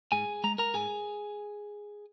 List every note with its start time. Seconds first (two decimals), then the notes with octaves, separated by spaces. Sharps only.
0.12 G#2 G#4 G#5
0.44 G#3 A#5
0.58 A#4 A#5
0.74 G#2 G#4 G#5